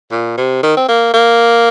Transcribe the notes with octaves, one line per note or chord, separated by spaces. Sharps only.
A#2
C3
D#3
C4
A#3
A#3